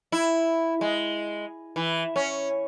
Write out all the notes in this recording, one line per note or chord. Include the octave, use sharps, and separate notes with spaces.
E4
G#3
E3
C#4